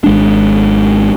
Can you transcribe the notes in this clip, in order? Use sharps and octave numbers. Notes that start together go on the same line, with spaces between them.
G#1 G#3 D4